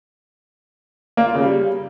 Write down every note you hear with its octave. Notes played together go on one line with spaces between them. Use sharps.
A#3
F4
C#3
G3